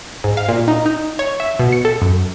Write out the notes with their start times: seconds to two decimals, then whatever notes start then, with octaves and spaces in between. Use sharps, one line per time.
0.24 G#2
0.37 F5
0.48 A#2
0.68 D#4
0.86 D#4
1.19 C#5
1.40 E5
1.59 B2
1.72 C#7
1.85 A4
2.02 F#2